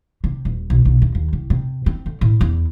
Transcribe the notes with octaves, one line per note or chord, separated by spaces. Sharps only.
C3
D#1
B1
B1
D#2
D#2
C2
C3
C4
D3
A2
E2